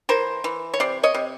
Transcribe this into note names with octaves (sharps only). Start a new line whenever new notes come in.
E3 A#4 C5
E3
C#5
C3 C5 D5
C#5 D#5
C3